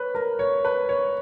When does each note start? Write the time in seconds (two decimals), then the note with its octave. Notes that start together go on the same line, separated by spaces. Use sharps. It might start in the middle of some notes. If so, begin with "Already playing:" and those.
Already playing: B4 C#5
0.15 A#4
0.39 C#5
0.65 B4
0.89 C#5